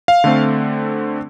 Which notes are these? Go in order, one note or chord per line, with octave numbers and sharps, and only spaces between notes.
F5
D3 A3 C4